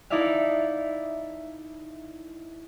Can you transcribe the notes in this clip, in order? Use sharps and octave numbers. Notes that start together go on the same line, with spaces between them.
D#4 E4 A4 D5 E5 F5